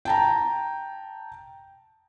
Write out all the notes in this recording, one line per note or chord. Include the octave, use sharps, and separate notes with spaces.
G5 A5 A#5